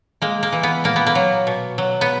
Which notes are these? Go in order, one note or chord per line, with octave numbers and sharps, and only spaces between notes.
G#3 A#3
A#3
E3
B3
A#2 A#3
B3
A#3
F#3
B2
F#3
B3